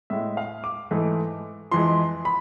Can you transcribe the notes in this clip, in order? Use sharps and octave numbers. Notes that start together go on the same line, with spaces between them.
A2 G#3 E5
F5
D6
G#2 E3 A3
F2 E3 G#3 C6
B5